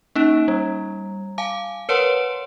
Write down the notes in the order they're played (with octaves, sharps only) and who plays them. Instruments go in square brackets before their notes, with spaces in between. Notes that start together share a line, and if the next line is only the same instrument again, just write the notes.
[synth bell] A#3 C#4 D#4
G3
F5 G#5 A5 D6
A#4 B4 C#5 F#5 A5 C6